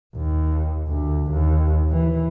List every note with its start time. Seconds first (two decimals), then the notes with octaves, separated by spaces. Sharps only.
0.15 D#2
0.87 D2
1.31 D#2
1.90 E3